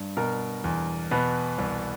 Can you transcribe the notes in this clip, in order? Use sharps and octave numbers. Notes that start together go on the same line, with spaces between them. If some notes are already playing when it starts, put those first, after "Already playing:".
Already playing: G2
B2 A#4
E2
B2 B4
C2